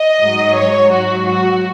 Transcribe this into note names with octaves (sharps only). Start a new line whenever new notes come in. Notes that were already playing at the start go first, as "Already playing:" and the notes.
Already playing: D#5
G#2 F#3
C#5
G#2 F#3 F#4
F#4